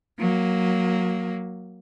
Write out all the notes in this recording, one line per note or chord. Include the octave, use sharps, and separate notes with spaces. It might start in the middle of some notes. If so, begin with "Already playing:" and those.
F#3 A#3